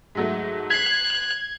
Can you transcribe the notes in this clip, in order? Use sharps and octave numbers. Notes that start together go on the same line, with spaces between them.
G#2 F#3 A3
F#6 G#6 B6 C7